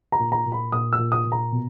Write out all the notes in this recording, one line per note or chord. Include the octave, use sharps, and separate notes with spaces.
A#5
A#2
A#5
A#2
B5
A#2 D#6
E6
A#2
D#6
A#2
A#5
B2